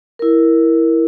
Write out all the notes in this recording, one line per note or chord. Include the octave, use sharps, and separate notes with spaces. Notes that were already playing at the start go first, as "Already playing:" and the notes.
E4 A#4